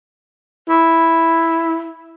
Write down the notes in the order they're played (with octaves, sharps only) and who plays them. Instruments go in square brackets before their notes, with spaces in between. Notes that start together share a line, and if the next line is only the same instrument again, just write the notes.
[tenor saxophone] E4